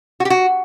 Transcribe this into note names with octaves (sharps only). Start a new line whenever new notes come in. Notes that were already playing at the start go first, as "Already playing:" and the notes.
F#4
G4
F#4